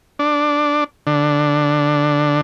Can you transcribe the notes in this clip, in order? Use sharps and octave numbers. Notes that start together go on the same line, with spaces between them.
D4
D3